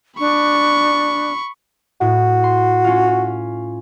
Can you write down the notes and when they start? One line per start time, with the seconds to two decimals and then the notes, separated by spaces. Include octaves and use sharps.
0.20 D4 B5 C#6
2.01 A2 F#4
2.44 C6
2.84 C#4 F4